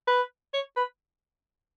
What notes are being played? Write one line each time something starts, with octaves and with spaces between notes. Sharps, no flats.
B4
C#5
B4